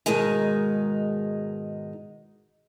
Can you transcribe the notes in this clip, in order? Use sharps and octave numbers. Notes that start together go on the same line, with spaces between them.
G#2 B2 D#3 G#3 D#4